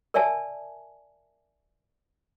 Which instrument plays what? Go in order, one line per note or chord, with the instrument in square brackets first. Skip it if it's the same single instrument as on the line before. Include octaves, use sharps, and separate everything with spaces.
[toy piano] A#4 D5 E5 G#5 A5